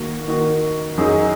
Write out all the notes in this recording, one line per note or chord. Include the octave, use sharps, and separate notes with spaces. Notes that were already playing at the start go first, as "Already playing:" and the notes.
Already playing: D#3 A#3 F#4
D#3 A#3 F#4
F#2 F#3 D#4 G#4